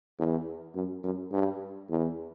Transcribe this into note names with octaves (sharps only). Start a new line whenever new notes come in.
E2
F#2
F#2
G2
E2